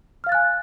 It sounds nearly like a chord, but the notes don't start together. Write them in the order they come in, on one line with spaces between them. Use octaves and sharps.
F6 F5 A6 F#6 G#5